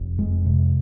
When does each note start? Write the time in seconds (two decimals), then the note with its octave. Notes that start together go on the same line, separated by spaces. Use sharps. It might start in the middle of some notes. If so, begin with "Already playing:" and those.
Already playing: F1
0.18 F2 G#3
0.45 C3